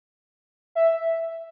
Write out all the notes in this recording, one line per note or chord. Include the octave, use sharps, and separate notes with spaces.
E5